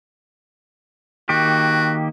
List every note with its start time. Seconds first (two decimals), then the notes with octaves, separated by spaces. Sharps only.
1.29 D#3 A#3 F#4 G4